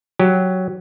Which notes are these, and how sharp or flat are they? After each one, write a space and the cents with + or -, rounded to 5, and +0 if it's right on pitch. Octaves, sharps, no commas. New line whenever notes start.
F#3 +0 G4 +0